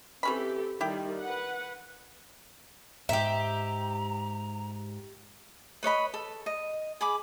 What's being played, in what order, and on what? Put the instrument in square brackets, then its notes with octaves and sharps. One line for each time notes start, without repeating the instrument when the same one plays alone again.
[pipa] E3 C#4 B5 [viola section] C4 G4 A4
[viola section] D#3 G3 [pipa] E4 G4
[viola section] B4 F#5
[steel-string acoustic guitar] G#2 G5 [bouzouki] G4 E5 [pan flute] A#5
[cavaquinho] B4 C#5 D#5 B5
A4
D#5
G#4 B5 D6